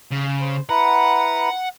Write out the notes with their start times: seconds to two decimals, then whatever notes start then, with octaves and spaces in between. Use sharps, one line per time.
0.11 C#3
0.41 C5
0.69 E4 B4 F#5 A#5